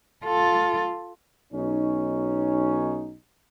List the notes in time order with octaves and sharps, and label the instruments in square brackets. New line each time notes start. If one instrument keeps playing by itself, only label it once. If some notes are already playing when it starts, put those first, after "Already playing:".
[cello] F4 A4
[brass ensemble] B1 C#4 D#4